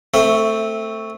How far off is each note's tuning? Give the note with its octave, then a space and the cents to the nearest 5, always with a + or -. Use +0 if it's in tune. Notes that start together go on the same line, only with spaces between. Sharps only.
A3 +15 C4 +0 E5 +0